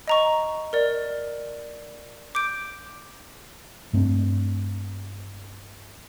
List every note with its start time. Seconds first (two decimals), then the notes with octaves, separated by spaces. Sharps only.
0.08 D#5 A#5 C#6
0.73 A#4 D5
2.35 D6 G6 D7
3.93 G2 A3 C4 D4